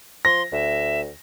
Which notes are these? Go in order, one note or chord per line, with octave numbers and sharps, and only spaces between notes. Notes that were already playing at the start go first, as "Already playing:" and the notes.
F3 C6 A#6
D2 E5